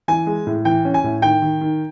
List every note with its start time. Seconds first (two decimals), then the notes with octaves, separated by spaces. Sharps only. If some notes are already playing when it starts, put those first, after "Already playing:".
0.08 E3 G#5
0.27 G#3
0.47 A2
0.65 E3 G5
0.85 C#4
0.94 G#5
1.04 A2
1.22 D#3 G5
1.42 D#3
1.61 D#3